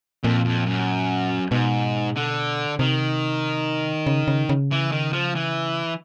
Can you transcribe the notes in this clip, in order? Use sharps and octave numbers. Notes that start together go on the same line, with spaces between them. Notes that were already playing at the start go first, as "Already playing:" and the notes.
F2 A#2
F2
F#2
G#2 B2
D3
C3 D#3
C#3
C#3
C#3
E3
D#3
F3
E3